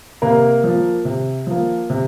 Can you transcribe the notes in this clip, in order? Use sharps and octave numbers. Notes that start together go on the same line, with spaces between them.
C3 A#3 A#4
F3 A#3
C3
F3 A#3
C3